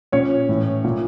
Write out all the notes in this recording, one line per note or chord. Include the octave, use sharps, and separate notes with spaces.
A#2 C#4 C#5
A2 E3
A#2